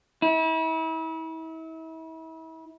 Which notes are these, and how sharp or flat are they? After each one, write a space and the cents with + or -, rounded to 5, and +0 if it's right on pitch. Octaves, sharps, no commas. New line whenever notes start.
E4 -35